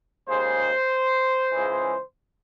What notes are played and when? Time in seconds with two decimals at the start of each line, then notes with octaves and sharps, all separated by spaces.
0.28 D#2 C#3 G#3 C5
1.52 C#2 C#3 E3 G#3